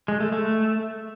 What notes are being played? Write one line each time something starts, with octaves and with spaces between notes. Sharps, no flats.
G#3
A3
A3